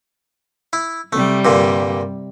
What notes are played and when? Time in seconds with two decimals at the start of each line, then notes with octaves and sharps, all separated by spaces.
0.73 E4
1.13 C3 G3 A3
1.45 G2 A#2 D3